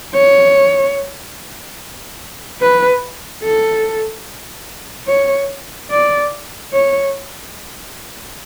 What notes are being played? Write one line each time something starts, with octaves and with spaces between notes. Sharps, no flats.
C#5
B4
A4
C#5
D5
C#5